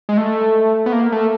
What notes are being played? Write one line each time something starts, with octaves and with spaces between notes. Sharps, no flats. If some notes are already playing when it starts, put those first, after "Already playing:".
G#3
A3
B3
A#3
A3